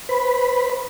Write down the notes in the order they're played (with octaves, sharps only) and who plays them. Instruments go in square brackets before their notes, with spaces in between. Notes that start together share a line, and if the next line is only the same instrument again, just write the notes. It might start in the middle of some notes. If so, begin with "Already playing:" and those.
[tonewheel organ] B4 C5 B5